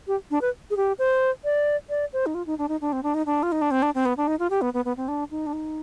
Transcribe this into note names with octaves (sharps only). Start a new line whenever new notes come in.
G4
D4
B4
G#4
G4
C5
D5
D5
C5
D#4
F4
D#4
D4
D#4
D4
C4
D4
D#4
D4
F4
D#4
D4
C4
D4
C4
B3
D4
D#4
F4
G4
B3
B3
B3
C4
D4
D#4
D4
D#4